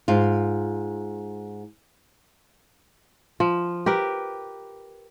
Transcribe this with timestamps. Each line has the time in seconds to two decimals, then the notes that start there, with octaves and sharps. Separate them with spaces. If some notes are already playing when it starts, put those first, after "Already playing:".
0.08 G#2 F4
3.40 F3
3.86 G4 A#4 B4